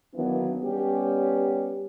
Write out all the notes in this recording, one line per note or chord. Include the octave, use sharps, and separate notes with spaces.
D#3 E3 F#3 A#3 B3 D4
G3 B3 C#4 G4